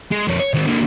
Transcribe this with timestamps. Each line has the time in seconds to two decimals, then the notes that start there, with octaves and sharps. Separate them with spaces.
0.12 G#3
0.27 F2 C#5
0.39 C#5
0.54 D#3 C4
0.66 D3 A#3